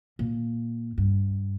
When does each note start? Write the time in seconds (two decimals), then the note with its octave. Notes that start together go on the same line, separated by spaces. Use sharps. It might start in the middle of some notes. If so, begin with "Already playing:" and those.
0.19 A#2
0.98 G2